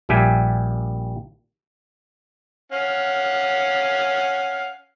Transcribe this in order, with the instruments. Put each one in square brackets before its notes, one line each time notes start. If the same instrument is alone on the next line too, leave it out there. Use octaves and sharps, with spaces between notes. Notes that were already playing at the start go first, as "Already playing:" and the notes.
[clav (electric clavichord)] A#1 A#2 G3 G4 E5 G#5
[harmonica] C#4 F5 F#5